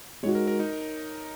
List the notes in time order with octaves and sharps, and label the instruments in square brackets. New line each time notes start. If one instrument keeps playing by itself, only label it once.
[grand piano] G#3 D#4 F#4 [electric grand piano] C#5
[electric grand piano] A#4
A#4
D#4